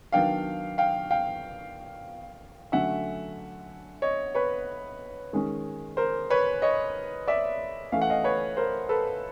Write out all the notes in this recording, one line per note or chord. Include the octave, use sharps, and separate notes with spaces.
D#3 F#3 B3 D4 F5 G5
F5 G5
F5 G5
D3 F#3 A3 C#4 E5 F#5
C#5 D#5
B4 C#5
D#3 G#3 C#4
A#4 C5
B4 C#5
C#5 D#5
D5 E5
E3 A3 C#4 F5
F#5
D#5 F5
B4 C#5
A#4 C5
A4 B4